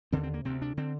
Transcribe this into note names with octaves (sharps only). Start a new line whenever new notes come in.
D#2 D3 C4
C4
A#3
D2 C3 C4
D4
D3 C4